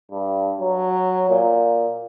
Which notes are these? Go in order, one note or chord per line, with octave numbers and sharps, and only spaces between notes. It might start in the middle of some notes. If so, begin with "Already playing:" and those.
G2
F#3
A#2